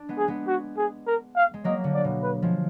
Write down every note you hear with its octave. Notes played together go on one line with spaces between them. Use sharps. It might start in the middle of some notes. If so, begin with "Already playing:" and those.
Already playing: D4
G#3 B3
G#4
G#3 B3
F#4
G#4
A#4
F5
G#3
F#3 A#3 D#5
D3
D5
B2
B4
F3 G#3